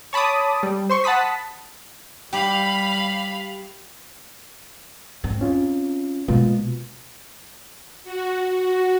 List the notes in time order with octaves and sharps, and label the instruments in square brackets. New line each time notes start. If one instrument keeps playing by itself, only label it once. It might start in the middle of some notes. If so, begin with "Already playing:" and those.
[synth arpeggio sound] C#5 A5 B5 D6 D#6
G3
C5 C6 C#6
F#5 A5 B5 D#6 B6
[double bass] G3 [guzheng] G4 [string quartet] F5 B5
[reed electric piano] F2 G#2 [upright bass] C4
[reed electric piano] C#4 F4
[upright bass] B2 G#3 [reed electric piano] A#3 B3 F4
[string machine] F#4
F#4